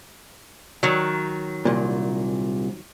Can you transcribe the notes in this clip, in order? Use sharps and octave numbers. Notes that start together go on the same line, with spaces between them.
D#3 F#3
C2 A#2